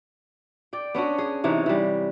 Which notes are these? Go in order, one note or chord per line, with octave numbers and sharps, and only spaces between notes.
D5 G5
B3 C#4 D4 F#4
G#4
C3 E3 D#4 C#5
E3 G3